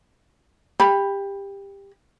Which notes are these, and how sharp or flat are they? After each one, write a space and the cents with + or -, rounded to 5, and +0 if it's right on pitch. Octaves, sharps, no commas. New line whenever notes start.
G4 +20 B5 +0